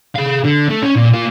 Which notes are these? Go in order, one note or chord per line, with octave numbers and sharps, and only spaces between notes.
G#4 F5
D3
A3
C#4
A#2
A#3 F4